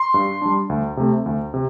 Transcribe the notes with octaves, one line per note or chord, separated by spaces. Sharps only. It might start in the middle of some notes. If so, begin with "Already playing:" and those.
Already playing: C6
G2
G3 D4
D2
C3 A3 C4
D2
C3